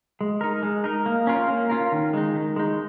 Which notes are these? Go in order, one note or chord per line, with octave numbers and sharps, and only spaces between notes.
G#3
D#4 A#4
G#3
D#4 A#4
A#3
C#4 F4 A#4
A#3
C#4 F4 A#4
D#3
G#3 D#4
D#3
G#3 D#4